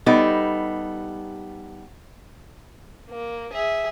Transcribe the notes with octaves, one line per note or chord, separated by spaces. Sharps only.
G3 B3 D#4 A4
A#3
G#4 E5